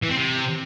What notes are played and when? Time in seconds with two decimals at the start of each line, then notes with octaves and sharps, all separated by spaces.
0.02 E3
0.09 C4
0.16 C3